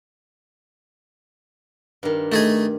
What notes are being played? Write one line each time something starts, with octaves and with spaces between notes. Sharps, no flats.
G2 D#3
A3 D#4 G#4